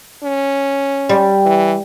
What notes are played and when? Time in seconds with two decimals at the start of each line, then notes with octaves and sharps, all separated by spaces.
0.24 C#4
1.09 G3
1.46 E3